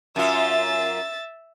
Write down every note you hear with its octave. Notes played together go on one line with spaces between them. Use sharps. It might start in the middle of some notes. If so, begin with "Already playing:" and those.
F#2 F4 E5 A6